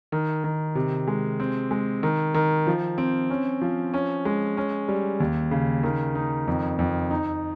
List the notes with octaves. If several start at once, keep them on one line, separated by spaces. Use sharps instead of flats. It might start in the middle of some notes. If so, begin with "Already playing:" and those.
D#3
D#3
C3
G#3
C4
G#3
D#3
D#3
F3
C4
C#4
F3
C#4
G#3
C#4
G3
D#2
C#3
D#3
D#4
F2
F2
D#4